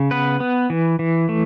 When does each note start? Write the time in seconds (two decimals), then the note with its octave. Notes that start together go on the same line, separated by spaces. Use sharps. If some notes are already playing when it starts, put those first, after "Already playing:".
Already playing: C#3
0.11 B3 B4
0.40 B3
0.70 E3
0.99 E3
1.29 A3